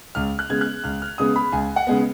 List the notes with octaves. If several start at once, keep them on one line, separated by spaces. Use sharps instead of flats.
C#2 F6
F#6
C#3 G#3 B3 G#6
F#6
C#2 F6
F6
C#3 G#3 B3 D#6
B5
C#2 G#5
F#5
C#3 G#3 B3